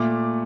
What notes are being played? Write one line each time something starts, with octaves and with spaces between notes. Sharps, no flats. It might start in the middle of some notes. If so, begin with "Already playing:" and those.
Already playing: A#2 A3 D6